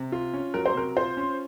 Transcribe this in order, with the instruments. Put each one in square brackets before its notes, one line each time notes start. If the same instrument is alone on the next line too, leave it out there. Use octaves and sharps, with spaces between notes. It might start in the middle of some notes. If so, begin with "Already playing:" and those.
Already playing: [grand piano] C3
F4
C#4
[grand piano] F#3 [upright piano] A#4
[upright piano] C5
[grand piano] C3 [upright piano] A#4
[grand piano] F4 [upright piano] C5
[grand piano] C#4